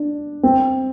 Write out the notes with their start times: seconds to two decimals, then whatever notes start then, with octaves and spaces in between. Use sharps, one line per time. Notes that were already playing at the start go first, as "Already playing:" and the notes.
Already playing: D4
0.43 C4